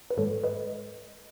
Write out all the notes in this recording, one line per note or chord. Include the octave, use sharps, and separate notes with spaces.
B4
G#2 D#3 G#3 A4 C#5
B4 D#5